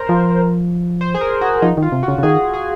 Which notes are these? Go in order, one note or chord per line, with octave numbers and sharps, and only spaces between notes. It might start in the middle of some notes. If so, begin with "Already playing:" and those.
Already playing: A#4 C5
F3
C5
G#4
A#4
F#4
F3 D#4
D#3
F4
C3
F#4
C#3
C#3
D#3 G#4
G#4